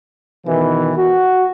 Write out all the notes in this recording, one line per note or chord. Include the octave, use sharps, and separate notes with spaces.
B2 D#3 E3
F#4